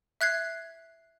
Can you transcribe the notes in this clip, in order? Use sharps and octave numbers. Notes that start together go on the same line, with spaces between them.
E5 F#6 G#6 C7